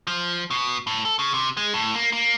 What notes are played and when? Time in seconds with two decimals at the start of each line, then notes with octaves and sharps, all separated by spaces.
0.07 F3
0.50 B2
0.87 A2
1.05 A4
1.19 C#3
1.34 C3
1.57 G#3
1.74 A2
1.94 A#3
2.12 A#3